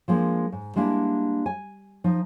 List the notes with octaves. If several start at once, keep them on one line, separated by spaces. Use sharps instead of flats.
F3 G#3 A#3 D4
G#2
G3 G#3 A#3 D4 E4
G#5
F3 D#4